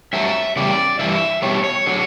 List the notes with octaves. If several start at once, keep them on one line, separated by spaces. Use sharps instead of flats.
G2 F#3 A3 E5
E2 C#3 G3 D5
G2 E3 G3 E5
B2 G3 C#5
C#5
D3 F#3